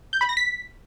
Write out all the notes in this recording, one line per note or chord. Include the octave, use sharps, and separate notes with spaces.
G6
B5
A#6
B6